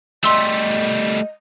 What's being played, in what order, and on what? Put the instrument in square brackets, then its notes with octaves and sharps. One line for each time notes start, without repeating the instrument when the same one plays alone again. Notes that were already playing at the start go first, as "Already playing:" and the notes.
[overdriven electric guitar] G3 A3 [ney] D#5 [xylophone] C6 E6